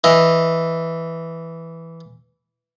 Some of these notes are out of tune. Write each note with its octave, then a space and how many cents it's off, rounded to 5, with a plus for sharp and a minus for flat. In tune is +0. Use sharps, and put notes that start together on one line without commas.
E3 +0 D#5 +0